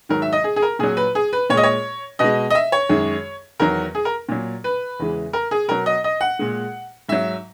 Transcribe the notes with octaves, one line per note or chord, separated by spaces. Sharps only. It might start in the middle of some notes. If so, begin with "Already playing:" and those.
G#2 D#3 F#3 A#4
E5
D#5
G#4
G#4
A#4
A#2 F#3 G#4
B4
G#4
B4
A#2 G#3 C#5 D#5
C#5
B2 G#3 D#5
D#5
E5
C#5
F#2 D#3 G#3
E2 D#3 F#3 A#4
G#4
A#4
A#2 F#3
B4
E2 C#3 E3 G#3
A#4
G#4
B2 F#3 A#4
D#5
D#5
F#5
A#2 G#3
G#2 F#3 E5